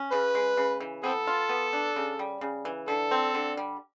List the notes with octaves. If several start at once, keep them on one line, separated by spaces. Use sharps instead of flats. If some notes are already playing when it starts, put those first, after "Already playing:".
Already playing: C#4
C#3 B4
G#3
C#3
E3
B3 C4 A4
F4
B3
D4
C#3
G3
C#3
E3
D3 A4
C4
D3
G3